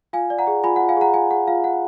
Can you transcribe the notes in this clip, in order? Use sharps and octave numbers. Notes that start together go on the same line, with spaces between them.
F4 F5 G#5
D5
F#5 A#5
G#4
F4 G#5 B5
F4 F#5
F5 G#5
G#4 F#5 A#5
F4 F5 G#5
G#4 F#5
F4 F5
F4 F#5